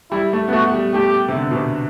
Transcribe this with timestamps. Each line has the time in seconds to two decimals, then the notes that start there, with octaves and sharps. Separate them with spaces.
0.11 G3 E4
0.33 A3
0.48 B3
0.53 A3 F#4
0.73 G3
0.94 A3 G4
1.28 C3
1.35 D3
1.51 B2
1.55 C3